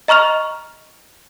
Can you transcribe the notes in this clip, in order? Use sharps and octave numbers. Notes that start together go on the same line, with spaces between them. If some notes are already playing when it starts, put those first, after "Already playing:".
D#5 A#5 C#6 F6 F7